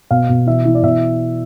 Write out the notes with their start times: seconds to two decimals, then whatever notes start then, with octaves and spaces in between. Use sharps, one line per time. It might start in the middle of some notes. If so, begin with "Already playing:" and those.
0.11 B2 F5
0.29 B2
0.47 E3 E5
0.65 E3
0.75 D5
0.83 B2 E5